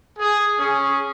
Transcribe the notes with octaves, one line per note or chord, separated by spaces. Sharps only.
G#4
C#4 G#4